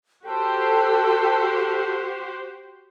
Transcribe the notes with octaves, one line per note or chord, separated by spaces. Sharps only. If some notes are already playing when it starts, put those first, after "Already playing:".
F#4 G4 A4 C5 G5